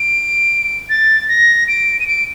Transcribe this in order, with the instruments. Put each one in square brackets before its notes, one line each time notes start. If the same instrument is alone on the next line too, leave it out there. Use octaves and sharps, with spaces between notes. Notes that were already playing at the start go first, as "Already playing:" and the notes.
Already playing: [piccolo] D7
A6
A#6
D7
D#7
D7